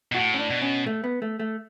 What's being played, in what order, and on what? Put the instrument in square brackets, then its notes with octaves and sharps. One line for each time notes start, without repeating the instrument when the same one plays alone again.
[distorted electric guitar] B2
[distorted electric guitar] A2 [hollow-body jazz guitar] F#4
[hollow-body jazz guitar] C#4
D4
[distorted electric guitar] B2
[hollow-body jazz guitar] C#4
A3
B3
A3
A3